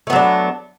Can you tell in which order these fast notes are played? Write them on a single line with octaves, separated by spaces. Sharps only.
A3 B3 F#3 D4